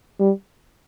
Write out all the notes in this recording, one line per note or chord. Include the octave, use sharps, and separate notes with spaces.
G3